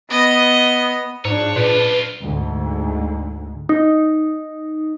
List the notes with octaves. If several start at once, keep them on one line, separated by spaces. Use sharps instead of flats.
B3 D#5
G#2 F3 D4 G#4 C#5
F#2 A#2 F4 B4
D2 G#2
D#4